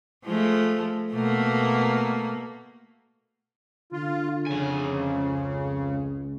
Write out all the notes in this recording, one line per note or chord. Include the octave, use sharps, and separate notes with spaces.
F3 G#3 A3
B2 A3 A#3
D3 F4
F2 C#3 G#5
C#2